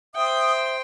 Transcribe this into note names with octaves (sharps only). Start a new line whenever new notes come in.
C5 E5 G5 D#6